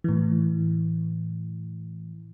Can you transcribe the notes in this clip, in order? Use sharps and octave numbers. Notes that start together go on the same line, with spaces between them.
A2 E3